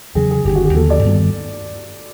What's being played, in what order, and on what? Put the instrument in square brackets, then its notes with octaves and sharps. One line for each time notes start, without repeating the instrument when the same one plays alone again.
[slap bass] E2 C#3 F#3 [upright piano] G#4
[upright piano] G#4
[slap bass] G1 G2 D#3 [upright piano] G4
[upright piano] F#4
G4
[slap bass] D#2 D3 F3 A#3 [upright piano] A4
[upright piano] D5
[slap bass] G2 D#3 G3 B3